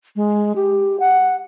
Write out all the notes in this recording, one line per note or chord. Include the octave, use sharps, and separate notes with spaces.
G#3
G4
F#5